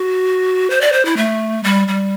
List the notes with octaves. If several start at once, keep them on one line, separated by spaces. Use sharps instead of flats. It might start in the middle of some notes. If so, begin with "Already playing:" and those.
Already playing: F#4
C5
D5
C5
E4
A3
G3
G3